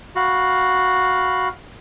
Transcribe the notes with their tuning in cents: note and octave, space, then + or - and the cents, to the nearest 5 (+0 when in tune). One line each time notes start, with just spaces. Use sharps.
F#4 +0 F5 +10 B5 +0